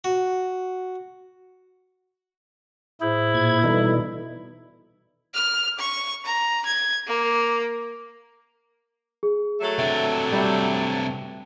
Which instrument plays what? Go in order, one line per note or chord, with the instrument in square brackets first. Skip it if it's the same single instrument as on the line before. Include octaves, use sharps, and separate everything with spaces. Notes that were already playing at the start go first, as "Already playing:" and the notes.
[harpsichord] F#4
[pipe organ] A2 G#4 C5 [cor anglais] E4
[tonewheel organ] A#2 G#6
[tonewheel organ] B2 E3 D#4 [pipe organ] G3 A4
[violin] F6
C#6
A#5
G#6
A#3
[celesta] G#4
[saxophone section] F#3 A3
[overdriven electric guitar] C3 D4 [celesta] E5
[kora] G3 G5